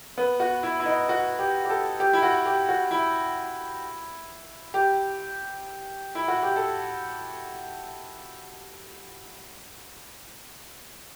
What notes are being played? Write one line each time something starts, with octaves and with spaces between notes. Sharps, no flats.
B3
F#4
E4
E4
D#4
F#4
G4
G4
A4
G4
E4
F#4
G4
F#4
E4
G4
E4
F#4
G4
A4